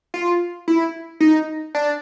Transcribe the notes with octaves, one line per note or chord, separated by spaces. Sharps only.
F4
E4
D#4
D4